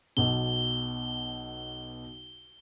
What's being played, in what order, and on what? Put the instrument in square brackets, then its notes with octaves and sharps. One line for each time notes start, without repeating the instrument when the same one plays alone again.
[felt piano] B1 B2 [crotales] G7